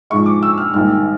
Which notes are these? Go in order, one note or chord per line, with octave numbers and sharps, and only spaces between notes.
G#2 F3 G#3 C#6
D6
E6
F6
A#1 G#2 D#3 G3 F6